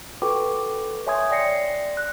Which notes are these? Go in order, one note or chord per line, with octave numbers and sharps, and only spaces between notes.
F#4 A4 B4 G5 C#6 D6
C#5 E5 G#5 C6 D#6 G#6
D5 G5 A#6 C7 C#7
F#6